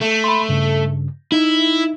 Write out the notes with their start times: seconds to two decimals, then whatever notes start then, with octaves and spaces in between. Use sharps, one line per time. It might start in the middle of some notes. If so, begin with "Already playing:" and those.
0.01 A3
0.24 B5 C6
0.49 G2 C#3
1.32 D#4 E4